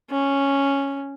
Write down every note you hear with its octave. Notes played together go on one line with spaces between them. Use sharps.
C#4